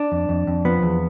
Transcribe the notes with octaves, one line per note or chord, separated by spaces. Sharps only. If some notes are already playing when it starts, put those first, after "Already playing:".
Already playing: D4
F2
F2
F2
F3 B3
E2